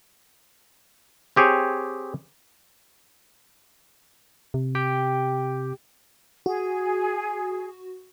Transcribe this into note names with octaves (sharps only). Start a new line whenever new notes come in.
C4 G4 G#4 C#5
C3
G4 G5
F#4 G#4